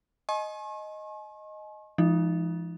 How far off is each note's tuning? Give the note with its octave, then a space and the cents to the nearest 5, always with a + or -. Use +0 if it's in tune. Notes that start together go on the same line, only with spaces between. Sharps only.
D#5 +0 G#5 +40 C#6 -45
F3 -40 G#3 +0 D#4 +0